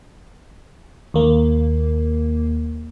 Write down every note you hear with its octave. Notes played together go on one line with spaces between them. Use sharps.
D#2 A#3